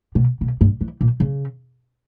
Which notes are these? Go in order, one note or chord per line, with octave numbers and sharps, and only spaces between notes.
B2
B2
G2
E3
A#2
C#3